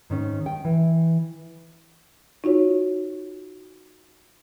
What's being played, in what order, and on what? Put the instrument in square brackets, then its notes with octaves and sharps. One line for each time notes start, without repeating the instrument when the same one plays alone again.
[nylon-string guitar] G#2 D#3 C#4
G5
E3
[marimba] D#4 F4 F#4 C#5